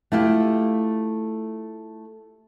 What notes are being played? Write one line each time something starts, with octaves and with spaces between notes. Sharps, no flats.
A3 E4 F4 G4